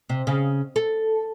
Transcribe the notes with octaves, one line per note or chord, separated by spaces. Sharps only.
C3
C#3
A4